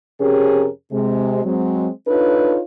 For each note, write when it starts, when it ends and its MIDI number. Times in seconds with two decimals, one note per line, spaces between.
0.21 0.68 41
0.21 0.68 48
0.21 0.68 61
0.21 0.68 67
0.21 0.68 68
0.21 0.68 70
0.92 1.44 48
0.92 1.44 56
1.45 1.89 54
1.45 1.89 56
1.45 1.89 60
2.08 2.60 62
2.08 2.60 63
2.08 2.60 65
2.08 2.60 69
2.08 2.60 71
2.08 2.60 73